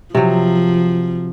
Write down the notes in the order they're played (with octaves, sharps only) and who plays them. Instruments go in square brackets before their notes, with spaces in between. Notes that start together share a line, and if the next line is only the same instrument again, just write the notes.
[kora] C3 F#3 [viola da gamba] F3